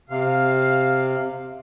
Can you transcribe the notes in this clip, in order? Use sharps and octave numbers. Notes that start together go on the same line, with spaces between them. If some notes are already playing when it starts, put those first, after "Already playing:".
C3 F5